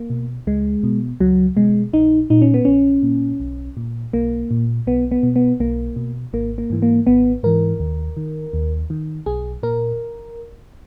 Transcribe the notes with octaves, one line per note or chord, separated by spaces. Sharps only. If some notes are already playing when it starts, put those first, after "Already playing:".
Already playing: A#3
B2
C#2 G#3
B2
C#2 F#3
B2 G#3
A#1 D#4
A#2 D#4
C#4
B3
A#1 C#4
A#2
B1
A#2
B1 A#3
A#2
B1 B3
B3
B2
B3
B1 A#3
B2
G#1 A#3
A#3
G#2 E3
A#3
G#1 B3
G#2 E3 A#4
D#2
D#3
D#2
D#3
B1 G#4
A#2 A#4